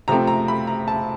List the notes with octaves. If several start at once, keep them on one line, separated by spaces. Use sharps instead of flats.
C3 F3 A3 C4 A#5
A#5
B5
A#5
A5